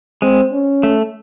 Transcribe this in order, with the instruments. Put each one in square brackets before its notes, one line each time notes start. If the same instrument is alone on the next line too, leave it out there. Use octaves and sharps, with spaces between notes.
[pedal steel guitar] G#3 [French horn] C4
[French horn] C#4
[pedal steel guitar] A3